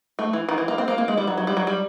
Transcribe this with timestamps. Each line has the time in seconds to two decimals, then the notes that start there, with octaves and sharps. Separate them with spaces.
0.19 A3
0.33 E3
0.49 D#3
0.58 E3
0.68 A#3
0.78 C4
0.88 A#3
0.98 A#3
1.08 G#3
1.17 G3
1.27 F#3
1.38 F#3
1.47 G3
1.57 F#3
1.67 G3